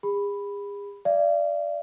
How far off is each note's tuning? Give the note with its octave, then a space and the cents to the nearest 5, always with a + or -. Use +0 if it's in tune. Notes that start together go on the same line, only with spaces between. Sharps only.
G#4 -40 B5 +0
D5 +0 F5 -45